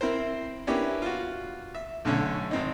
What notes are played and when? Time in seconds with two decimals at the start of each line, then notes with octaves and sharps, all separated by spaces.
0.01 C4 E4 A#4 C5
0.67 A#3 B3 C#4 D4 E4 G4
1.02 F4 F#4
1.74 E5
2.05 B1 D3 A3 C#4
2.51 G#1 C4 D#4